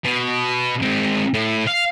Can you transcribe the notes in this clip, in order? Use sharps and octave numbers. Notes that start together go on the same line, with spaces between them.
B2
G#3 C4
A2
F5